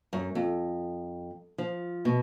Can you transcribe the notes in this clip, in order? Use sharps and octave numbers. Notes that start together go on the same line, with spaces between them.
F#2
F2
F3
B2